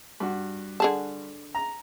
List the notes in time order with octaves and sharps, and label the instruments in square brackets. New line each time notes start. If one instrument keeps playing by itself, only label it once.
[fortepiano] G2 F#4
[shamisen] D3 G#4 A5
[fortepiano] A#5